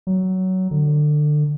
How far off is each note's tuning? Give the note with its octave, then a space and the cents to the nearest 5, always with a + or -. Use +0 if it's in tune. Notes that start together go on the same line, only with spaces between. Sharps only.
F#3 +15
D3 +25